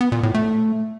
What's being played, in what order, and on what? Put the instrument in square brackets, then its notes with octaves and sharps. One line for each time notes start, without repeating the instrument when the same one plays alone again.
[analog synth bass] B3
A#2
A2
A3